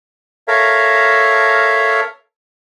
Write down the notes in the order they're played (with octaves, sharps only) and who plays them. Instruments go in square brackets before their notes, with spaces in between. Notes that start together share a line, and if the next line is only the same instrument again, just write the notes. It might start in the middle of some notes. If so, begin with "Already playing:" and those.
[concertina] A4 A#4 C#5 E5 F5 A#5